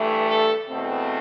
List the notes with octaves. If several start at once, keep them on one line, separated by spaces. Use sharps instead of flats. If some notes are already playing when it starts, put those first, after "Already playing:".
Already playing: G2 E3 A3
A4
E2 B2 A3 C4